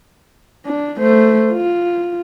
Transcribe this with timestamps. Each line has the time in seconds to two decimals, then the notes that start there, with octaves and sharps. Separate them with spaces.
0.66 D4
0.99 A3 C5
1.52 F4